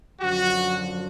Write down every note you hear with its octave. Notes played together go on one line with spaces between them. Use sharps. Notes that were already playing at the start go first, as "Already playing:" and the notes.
F#2 D3 F3 F#4